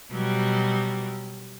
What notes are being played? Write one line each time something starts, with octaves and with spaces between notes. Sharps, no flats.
B2 F#3 G3